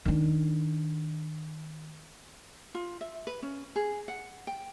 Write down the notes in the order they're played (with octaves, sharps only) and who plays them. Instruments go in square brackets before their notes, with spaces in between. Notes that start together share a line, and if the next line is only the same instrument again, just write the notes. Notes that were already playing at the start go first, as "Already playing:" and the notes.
[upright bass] D#3 D4
[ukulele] F4
E5
B4
C#4
G#4
F#5
G5